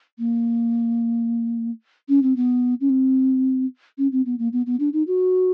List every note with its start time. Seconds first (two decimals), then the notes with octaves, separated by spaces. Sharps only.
0.19 A#3
2.09 C#4
2.22 C4
2.36 B3
2.81 C#4
2.89 C4
3.98 C#4
4.12 C4
4.26 B3
4.39 A#3
4.53 B3
4.66 B3
4.80 D4
4.93 D#4
5.07 F#4